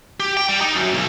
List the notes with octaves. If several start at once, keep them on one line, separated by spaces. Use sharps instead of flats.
G4
G5
G3
D#4
F#2
B1